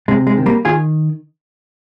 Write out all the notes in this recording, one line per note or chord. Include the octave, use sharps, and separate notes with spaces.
C3 G#3
G#3
D#3
G3 A#3
D#3 F4 G#4